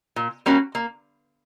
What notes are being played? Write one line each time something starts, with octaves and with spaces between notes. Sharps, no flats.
A#2
G3 A#3 C#4 F#4
A#3